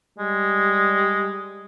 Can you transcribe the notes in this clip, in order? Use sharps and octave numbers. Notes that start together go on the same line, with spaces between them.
G3 G#3